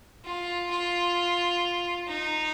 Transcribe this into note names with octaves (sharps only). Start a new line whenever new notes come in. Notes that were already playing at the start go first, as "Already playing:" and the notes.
F4
F4
D#4